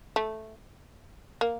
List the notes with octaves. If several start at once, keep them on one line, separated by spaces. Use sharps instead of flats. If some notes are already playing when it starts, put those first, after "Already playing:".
A3
A#3